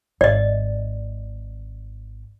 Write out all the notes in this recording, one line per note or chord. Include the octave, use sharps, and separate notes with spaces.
G#1 D5 D#5